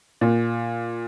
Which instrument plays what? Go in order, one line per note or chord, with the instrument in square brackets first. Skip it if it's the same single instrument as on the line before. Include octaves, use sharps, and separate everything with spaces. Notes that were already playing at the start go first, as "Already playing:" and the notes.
[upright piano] A#2